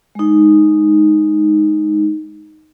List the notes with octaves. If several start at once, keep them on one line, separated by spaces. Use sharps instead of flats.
G#3 D#4